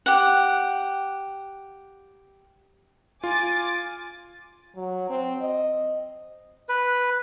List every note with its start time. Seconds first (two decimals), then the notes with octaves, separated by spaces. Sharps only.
0.06 G4 F#5
3.24 F4 G#5 D6 A6
4.76 F#3
5.09 C4
5.41 D#5
6.69 B4